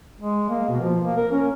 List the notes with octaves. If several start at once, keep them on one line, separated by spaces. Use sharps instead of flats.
G#3
A#3
B2
F3
A#3
A#4
C#4